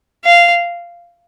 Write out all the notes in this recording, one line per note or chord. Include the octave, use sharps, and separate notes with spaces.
F5